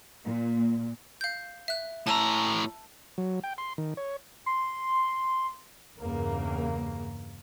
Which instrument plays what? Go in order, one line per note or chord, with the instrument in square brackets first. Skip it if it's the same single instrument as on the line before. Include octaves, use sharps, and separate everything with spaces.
[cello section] A#2
[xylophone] F5 G6
E5 F#6
[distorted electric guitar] A2 A#5 [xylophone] A5 E6
[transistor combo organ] F#3
G5
C6
D#3
C#5
[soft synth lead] C6
[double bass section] E2 G2 C#3 A#3